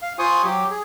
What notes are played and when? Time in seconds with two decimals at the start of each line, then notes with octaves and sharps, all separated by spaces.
0.02 F5
0.19 F4 C5 G#5 C#6 D#6
0.44 F#3 G4
0.71 G#4